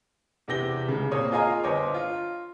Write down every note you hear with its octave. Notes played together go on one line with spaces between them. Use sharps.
E2 C3 G4 A#6 G7
C#2 C#3
A#2 A#3 C4 C#5 D#6
F4 G#4 D#5 F5 G#5 A#5
G1 C5 C#5 D#5 D6
F4